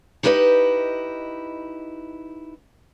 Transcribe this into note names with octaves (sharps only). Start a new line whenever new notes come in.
D#4 E4 G4 B4 C5 D#5